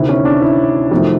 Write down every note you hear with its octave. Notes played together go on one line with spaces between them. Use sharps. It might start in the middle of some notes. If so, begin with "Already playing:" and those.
Already playing: D2 C3 D#3 E4
C#4
D4
E4
F2 C3 D#3 F#3 A3